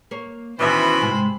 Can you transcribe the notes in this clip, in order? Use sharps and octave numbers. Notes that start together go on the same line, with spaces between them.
A#3 C#5
B2 D#3 E3 C#4 C5 E5 B5
G#2 C3 G#3